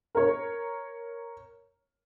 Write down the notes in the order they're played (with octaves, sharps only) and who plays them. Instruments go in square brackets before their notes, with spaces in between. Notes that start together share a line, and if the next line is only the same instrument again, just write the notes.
[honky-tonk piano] A#4 C#5